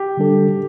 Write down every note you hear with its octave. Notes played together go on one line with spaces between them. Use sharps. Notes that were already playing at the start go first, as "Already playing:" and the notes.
Already playing: G4
D3 G3 D4 A4